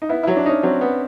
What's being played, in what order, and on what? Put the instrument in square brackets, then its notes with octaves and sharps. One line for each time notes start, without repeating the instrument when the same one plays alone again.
[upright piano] D#4
[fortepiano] B3 [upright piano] E4
[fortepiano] F#3 [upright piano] E4
[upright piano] D4
[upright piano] C#4 [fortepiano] D#4
[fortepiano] F#3 [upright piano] C4
[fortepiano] B3